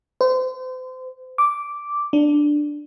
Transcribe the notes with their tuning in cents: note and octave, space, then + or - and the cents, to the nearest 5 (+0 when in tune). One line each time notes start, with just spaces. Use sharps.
C5 -35
D6 -5
D4 +5